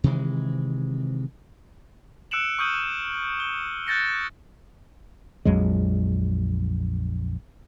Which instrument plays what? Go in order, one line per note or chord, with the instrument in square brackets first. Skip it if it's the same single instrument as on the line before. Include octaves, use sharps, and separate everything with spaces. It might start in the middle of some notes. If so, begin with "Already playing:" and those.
[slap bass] C3 D#3 E3 G#3
[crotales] E6 F#6 C#7 D7 E7 F#7
C#6 D#6 F6 G6 D#7 F#7
G7
F#6 G6 A6 A#6 C#7
[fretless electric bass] A#1 F2 F#3 G#3